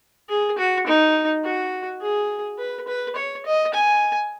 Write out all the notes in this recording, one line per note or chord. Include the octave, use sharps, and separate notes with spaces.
G#4
F#4
D#4
F#4
G#4
B4
B4
C#5
D#5
G#5